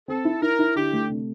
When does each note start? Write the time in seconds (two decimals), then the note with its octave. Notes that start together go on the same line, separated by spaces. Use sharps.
0.08 C4 A4
0.25 E4
0.42 E4 A#4
0.59 E4
0.76 D3 G4
0.93 A3
1.09 C3